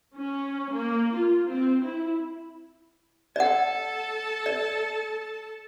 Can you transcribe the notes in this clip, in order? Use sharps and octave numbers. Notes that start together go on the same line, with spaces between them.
C#4
A#3
F4
C4
E4
A4 D5 F#5 A5
D5